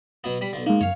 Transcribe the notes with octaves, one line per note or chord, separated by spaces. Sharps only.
B2 F#3 B3
G3 B5
B1 D3
G#3 A#3 D#4
F#2 C#5 F5